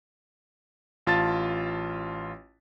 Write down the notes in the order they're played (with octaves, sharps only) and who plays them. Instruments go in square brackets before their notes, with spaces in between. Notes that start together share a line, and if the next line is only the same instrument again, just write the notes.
[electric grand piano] A1 F4 A5 A6